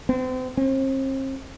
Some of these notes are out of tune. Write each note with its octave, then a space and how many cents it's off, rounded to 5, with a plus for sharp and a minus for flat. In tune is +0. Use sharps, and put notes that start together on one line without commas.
C4 -35
C4 +40